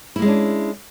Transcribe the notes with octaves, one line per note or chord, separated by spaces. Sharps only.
G#3 A#3 C#4 D4 E4